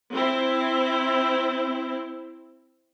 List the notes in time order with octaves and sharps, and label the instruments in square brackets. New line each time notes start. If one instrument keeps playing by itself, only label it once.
[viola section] C4 E4